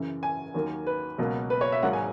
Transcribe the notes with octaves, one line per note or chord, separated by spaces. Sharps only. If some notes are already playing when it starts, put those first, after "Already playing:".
Already playing: F#2 C#3 E3
G#5
D#2 D#3 F#3 A#3
B4
C#2 B2 F#3 A#3
B4
C#5
E5
G#1 G#2 F#3 A#3 F#5
G#5